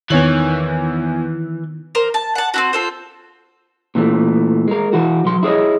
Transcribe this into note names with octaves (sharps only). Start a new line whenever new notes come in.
E2 D#3 E3 C#5 F#7
A#4 C5
A5
F#5 A5
C4 E4 F#4
F4 A4 C5
A#2 E3 A3
G#3 A#4
E3 E4 F#4
B1 F#3 C6
E4 G#4 C#5 D#5